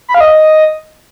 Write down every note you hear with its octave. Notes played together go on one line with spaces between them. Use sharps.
B5
F5
D#5